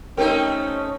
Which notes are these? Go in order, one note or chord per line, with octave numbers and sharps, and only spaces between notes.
A3 C4 C#4 D#4 G4 A#4